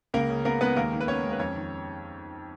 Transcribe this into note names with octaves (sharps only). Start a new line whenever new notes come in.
C#2 A#3 A#4
C#3
A#3 B3 A#4
G#3 B3 B4
D#2 A#3 A#4
D#3
B4
B3 C#4 C#5
G#3
B4
F2 C#4 C#5
D#3